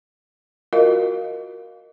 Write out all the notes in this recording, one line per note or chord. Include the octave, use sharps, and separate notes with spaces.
F4 F#4 A#4 D#5 F5